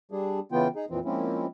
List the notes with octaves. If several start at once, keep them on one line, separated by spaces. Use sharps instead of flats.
G3 D4 G#4
C#3 E3 B3 F4 G5
D#4 G#4
F2 A#2 E3 F3 C4
F3 G#3 A#3 C4 C#4 E4